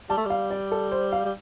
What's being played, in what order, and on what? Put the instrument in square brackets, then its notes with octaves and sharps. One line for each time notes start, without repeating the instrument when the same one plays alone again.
[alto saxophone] G3 [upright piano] A5
[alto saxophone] A3
G3
[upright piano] F5
D5
A4
C5
F5
[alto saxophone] G3